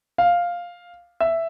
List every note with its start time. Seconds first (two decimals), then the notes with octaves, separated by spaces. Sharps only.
0.18 F5
1.20 E5